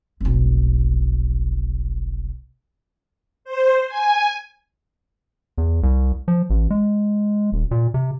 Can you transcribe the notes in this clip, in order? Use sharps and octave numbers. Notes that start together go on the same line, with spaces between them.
F1 B1
C5
G#5
E2
C2
F3
A1
G#3
D#1
A#2
C3